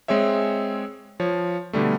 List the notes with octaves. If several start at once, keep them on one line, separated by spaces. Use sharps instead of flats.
G#3 C4 G#4 C#5 E5
F3 C#5
B2 D3 G3 A3